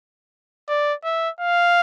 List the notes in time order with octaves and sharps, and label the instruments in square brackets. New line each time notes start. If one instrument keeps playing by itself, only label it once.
[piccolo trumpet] D5
E5
F5